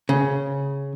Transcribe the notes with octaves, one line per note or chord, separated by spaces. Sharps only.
C#3